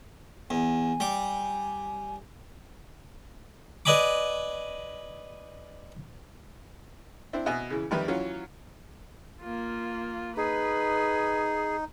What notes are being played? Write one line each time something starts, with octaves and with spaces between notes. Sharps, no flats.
E2 G#5
G3 D6
B4 D5 D#5 G#5 B5 D6
C4 D4 E4
B2 D#5 E5 G#5
C#3 E3
F2 D#3 G3 B4 E5
E3 F#3 C#4 F4
A#3 F4
D#4 G#4 B4